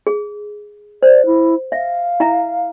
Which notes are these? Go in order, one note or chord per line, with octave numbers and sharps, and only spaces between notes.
G#4
C5 D5
E4
E5 F5
E4 E5 A#5